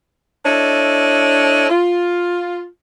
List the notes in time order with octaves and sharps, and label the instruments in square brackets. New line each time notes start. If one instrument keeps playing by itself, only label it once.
[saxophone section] D4 E4 A4 C#5 D#5
F4